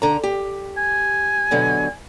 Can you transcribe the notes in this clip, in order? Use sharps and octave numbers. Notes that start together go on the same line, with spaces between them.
D3 A#5
G4
G#5
B2 D3 F#3